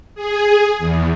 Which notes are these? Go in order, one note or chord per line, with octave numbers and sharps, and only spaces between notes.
G#4
E2